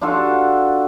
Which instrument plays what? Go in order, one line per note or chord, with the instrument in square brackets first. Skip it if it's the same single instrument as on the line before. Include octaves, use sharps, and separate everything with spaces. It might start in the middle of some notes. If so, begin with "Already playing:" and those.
[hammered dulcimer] D4 F4 F#4 A4